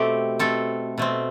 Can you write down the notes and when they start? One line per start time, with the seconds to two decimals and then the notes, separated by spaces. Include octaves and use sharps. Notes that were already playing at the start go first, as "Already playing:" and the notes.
Already playing: B2 A3 C4 G4
0.39 B2 A3 C4 A4
0.98 B2 A3 C4